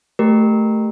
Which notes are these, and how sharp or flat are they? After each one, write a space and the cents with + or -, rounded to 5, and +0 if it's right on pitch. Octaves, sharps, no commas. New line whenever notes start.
A3 +0 G4 +0 A#4 +0